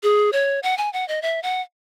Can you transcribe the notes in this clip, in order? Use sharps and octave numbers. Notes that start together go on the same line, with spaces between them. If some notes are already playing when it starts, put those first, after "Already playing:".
G#4
C#5
F#5
G#5
F#5
D#5
E5
F#5